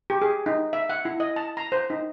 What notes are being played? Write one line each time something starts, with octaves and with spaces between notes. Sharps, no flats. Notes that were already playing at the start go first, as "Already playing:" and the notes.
G4
G#4
D#4
E5
F#5
E4
D#5
A5
A#5
C5
D#4